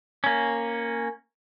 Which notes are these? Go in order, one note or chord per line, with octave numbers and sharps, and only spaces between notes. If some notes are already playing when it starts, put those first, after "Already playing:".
A#3 C#4